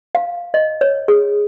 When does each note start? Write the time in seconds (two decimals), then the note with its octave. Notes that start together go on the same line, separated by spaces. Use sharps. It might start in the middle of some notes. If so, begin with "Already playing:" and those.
0.15 F5
0.54 D#5
0.81 C#5
1.08 G#4